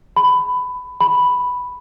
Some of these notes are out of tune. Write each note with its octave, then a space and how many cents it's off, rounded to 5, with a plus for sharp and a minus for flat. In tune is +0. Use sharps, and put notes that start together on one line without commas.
B5 +15
B5 +0